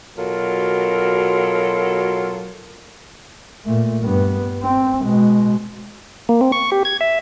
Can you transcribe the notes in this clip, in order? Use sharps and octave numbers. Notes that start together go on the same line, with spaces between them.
B2 F#3 F4 A4 A#4
A#2 A3
G2 B3
C4
B2 G#3
A#3
C4
C#6
G4
G#6
E5